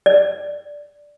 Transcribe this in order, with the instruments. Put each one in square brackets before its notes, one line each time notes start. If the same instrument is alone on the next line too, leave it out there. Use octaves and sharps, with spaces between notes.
[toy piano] D5